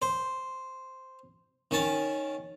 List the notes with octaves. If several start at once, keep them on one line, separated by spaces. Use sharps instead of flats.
C5
D#3 C#4 A5